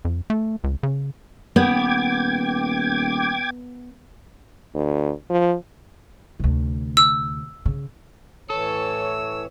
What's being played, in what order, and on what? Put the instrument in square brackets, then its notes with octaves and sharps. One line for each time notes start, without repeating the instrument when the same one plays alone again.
[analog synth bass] F2
A3
C#2
C#3
[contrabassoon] D#1 [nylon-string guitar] B3 [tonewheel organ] G5 D6 G#6
[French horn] D2
F3
[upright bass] D2 C3
[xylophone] E6
[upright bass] C#3
[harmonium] A2 E3 C#5 [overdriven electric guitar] A4 [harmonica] E6